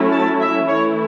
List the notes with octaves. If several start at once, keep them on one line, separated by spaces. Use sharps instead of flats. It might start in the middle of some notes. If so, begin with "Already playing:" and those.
Already playing: F#3 A3 C#4 E4
A5
E5
E3 A3 E4 C#5